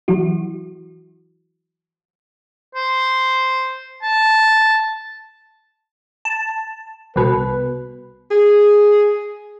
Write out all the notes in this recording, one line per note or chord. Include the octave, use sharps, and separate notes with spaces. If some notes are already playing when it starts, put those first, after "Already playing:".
E3 F#3 E4 F#4
C5
A5
A5
C2 B2 B4
G#4